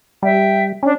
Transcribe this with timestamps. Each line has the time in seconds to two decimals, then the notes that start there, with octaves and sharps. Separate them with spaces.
0.23 G3 E5 G5
0.83 C#4 D4